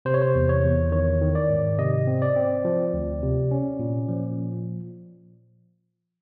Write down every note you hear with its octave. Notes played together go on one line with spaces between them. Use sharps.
C3 C5
C#5
C5
E2
C#5
E2
D#3 C#5
D#3
D5
G#2
C3 D#5
C4
D5
C4
F3
D2
C3
C#4
A#2
F3